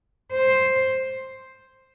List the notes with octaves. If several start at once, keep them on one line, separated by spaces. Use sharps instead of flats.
C5